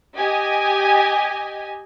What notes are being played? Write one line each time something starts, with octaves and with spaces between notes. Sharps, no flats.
G4 D#5 G#5